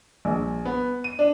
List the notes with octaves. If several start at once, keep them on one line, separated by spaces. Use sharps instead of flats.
A#1
B3
D#7
D4